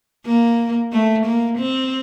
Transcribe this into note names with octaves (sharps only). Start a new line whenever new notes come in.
A#3
A3
A#3
C4